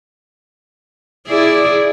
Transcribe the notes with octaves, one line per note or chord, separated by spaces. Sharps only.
E4 G#4 D5